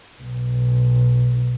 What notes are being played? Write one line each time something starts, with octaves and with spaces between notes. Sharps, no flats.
B1